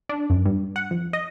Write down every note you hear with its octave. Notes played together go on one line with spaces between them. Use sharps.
D4
F#2
G2
F#5
F2
D#5